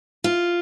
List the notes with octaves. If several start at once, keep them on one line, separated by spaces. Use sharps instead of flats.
F4